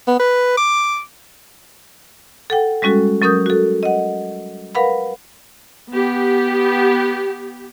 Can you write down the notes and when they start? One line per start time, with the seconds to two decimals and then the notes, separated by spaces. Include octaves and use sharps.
0.08 B3
0.19 B4
0.57 D6
2.50 A4 F#5 G5
2.82 G3 G#3 C#4 F#4 A4
3.22 F#3 C#4 A#4 D#6 G6
3.46 F#4 A4
3.83 D#5 F#5
4.75 A#4 B4 F5 F#5 B5
5.93 B3 G4